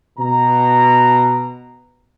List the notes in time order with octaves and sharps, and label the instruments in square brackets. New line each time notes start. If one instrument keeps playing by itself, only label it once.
[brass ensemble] B2 A#5